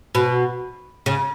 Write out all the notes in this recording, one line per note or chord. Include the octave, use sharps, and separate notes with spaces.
B2
C#3